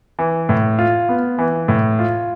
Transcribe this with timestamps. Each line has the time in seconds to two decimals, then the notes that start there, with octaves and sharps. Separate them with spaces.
0.19 E3
0.49 A2
0.79 F4
1.09 B3
1.38 E3
1.68 A2
1.99 F4